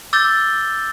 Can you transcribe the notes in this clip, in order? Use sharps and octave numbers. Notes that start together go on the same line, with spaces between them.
D6 E6 G6 A6 G7